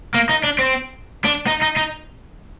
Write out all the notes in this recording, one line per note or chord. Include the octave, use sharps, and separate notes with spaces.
A#3
D#4
D4
C4
D4
D#4
D#4
D#4